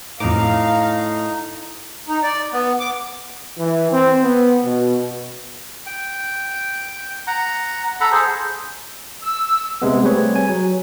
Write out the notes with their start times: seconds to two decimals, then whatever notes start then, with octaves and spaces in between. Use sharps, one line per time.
0.20 F2 A2 D#4 F5 A#5 D6
2.08 D#4
2.23 D5
2.52 B3
2.79 D6
3.59 E3
3.92 C4
4.23 B3
4.65 B2
5.86 G5
7.27 F#5 A#5
8.01 A4 F#5 A#5 B5
8.12 G#4 A4 C5
9.22 E6
9.82 C3 G#3 B3
10.03 G3 A3 C4 G#4 B4 C#5
10.36 G#5
10.49 F#3